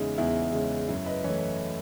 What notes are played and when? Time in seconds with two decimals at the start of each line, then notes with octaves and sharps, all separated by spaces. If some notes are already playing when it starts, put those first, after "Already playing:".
Already playing: E2 C#3 G#3 D#4 E4
0.18 E2 E4
0.53 C#3 G#3
0.88 F#2 E4
1.06 B4 D#5
1.24 E3 A3 C#5 E5